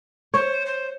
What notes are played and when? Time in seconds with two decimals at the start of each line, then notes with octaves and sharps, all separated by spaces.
0.34 C5 C#5
0.66 C5